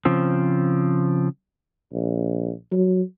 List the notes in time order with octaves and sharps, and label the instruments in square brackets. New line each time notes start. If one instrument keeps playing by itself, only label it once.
[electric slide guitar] C#3 F3 C4
[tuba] A#1
F#3